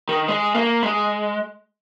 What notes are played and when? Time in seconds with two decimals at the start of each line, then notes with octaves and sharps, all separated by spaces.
0.09 D#3
0.28 G#3
0.55 A#3
0.83 G#3